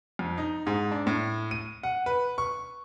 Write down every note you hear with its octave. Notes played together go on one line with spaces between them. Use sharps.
F2
D#4
G#2
D4
A2
D#7
F#5
B4
C#6